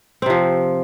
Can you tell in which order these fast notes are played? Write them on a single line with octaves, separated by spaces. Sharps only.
C4 C3 F3